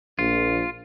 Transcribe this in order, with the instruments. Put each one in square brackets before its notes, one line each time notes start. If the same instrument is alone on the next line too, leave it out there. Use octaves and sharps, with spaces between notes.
[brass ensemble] A#1 [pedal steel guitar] F4